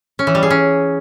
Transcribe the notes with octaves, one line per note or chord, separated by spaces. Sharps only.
C#4
E3
G3
G#4
C#4